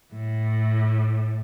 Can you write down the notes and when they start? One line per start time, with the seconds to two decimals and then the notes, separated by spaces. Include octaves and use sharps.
0.13 A2